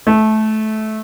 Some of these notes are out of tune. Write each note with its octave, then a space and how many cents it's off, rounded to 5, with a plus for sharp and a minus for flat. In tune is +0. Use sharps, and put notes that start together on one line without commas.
A3 -20